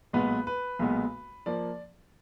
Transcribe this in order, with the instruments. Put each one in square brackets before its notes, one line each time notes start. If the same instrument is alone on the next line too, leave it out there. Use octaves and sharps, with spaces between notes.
[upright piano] B1 A#2 G#3 B3 B4
B4
B1 A#2 G#3 B3
F3 A#3 D5